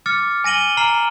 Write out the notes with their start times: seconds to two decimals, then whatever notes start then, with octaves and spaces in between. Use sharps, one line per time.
0.06 D6 F6 A6 C#7
0.44 G#5 A#6 D#7 F#7 G7
0.77 A#5 F6 C7 D7 F#7